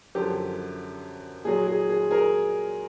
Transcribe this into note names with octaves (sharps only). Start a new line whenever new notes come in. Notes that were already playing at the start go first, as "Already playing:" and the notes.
F#2 D3 F3 G4
A#2 F#3 G#4
G#4
G#4
G#4 A#4